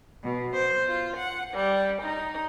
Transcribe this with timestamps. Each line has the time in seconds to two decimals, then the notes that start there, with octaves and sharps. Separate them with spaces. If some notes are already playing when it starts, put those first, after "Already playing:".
0.23 B2
0.55 C5
0.87 F4
1.16 F#5
1.53 G3
2.02 D#4